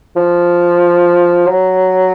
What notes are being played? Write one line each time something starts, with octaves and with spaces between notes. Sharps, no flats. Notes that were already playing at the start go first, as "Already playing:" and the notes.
F3
F#3